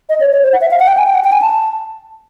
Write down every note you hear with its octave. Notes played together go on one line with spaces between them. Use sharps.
D#5
C#5
C#5
C5
F#5
E5
F5
F#5
G5
G#5
G5
F#5
G5
G#5
A5